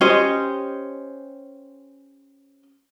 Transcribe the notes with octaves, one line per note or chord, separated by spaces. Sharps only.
C#4 G4 C5 D#5